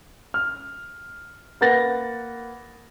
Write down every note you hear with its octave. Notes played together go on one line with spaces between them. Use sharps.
F6
A#3 B4 F#5 A6 A#6